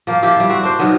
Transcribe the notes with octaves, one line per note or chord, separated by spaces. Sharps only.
F3 A#3
F3 E4 G4
G3 E4
C4 F#4
D4 C5
B2 D#3 F#3 B3